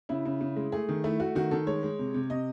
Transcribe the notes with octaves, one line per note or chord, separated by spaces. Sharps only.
C#3 E4
C#3
C#3
G#3
A3 G#4
D#3
A3 E4
A3 F#4
D#3 F#4
D#3 A4
G#3 C#5
G#3
C3
C3
C3 D#5